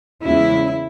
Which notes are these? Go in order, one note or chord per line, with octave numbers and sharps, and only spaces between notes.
E2 C#3 G#3 E4